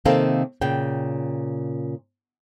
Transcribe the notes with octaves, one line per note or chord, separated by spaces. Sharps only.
C3 D#3 A#3 C4 A4 F5
A#2 C#3 G5